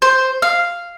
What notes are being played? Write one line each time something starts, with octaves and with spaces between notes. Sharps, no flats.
C5
F5